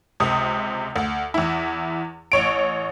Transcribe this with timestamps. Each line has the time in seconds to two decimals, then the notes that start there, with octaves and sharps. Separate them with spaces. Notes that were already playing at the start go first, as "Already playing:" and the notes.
0.20 C#2 C3 D#6
0.96 D2
1.34 E2 E4
2.32 A1 C#5 D7